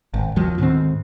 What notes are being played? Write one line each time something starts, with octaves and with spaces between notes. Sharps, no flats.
G#1
D#2 F3 F#3
D2 G#2 D#3 C4